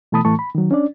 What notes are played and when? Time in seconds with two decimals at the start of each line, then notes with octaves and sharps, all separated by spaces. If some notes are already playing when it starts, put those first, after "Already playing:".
0.12 B2 E3 A3 A5 B5 D#6
0.25 A2 E3 A3 A5 C#6
0.39 B5
0.55 D#3 F#3
0.71 C#4 D4 D5